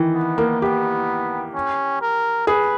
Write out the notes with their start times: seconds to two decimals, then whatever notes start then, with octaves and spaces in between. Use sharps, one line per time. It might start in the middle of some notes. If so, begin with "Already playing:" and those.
Already playing: D#3 E3
0.15 B3
0.38 A#3
0.62 B3 G4
1.55 C#4
2.01 A#4
2.47 G#4 B4